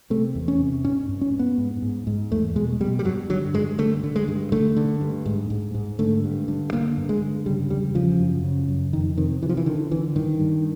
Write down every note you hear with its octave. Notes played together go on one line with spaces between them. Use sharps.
C3 A3
E2
C#4
C3
G2 C#4
G2
C#4
G2
B3
G#2
G#2
G#2
E2 A3
B2 G#3
B2 G3
G3
G2 F#3
D3 F#3
G2 G#3
D3 A3
D3
G#3
G2
D3 A3
D3
G2
G#2
G#2
G#2
D3 A3
G2
D3
D3 A#3
G2
G#3
D3
C#3 G3
E2 G3
C#3 F3
F#2
C#3
F#2
F2 D#3
C3 D#3
C3 E3
F3
E3
D3 D#3
D3 E3
G2 D#3
G2